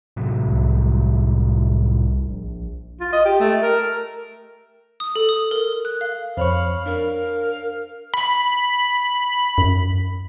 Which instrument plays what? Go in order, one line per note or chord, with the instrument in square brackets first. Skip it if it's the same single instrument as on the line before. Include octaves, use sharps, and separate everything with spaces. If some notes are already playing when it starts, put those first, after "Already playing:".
[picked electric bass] A2 C3 F#3
[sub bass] C2
A#1
[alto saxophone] F4
D#5
G4
A3
A#4
[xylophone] D#6
A4
D#6
A#4
F#6
F5
[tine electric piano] F2 C#6 [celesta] C5 C#5 [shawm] F5 [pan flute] B5
[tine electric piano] D4 [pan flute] A#4 [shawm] F5
[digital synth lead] B5
[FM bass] F#2